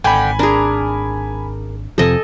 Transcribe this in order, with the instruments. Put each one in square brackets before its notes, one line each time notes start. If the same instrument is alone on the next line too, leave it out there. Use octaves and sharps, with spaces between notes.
[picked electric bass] G#1 [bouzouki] D3 D5 G5 [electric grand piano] G#5 B5
[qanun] D4 G#4 [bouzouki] A#4
[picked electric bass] F2 C3 F3 [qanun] A4 D#5 G#5